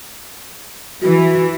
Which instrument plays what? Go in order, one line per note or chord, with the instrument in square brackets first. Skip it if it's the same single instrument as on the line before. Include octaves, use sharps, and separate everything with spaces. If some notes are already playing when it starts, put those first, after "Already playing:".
[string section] E3 [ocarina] F#4